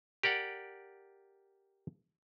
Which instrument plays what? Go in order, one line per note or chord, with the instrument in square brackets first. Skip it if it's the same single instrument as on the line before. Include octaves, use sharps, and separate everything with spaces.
[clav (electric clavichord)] G4 A#4 D5 F#5